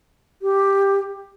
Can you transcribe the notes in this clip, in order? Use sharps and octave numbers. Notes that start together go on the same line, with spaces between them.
G4